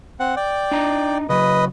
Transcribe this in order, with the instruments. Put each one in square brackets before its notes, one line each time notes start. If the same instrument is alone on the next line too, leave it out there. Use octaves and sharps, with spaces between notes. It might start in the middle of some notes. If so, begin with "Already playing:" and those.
[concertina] C4 F#5
D5 G5
[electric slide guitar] D4 D#4 A#5
[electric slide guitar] C#3 F#3 [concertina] B4 D#5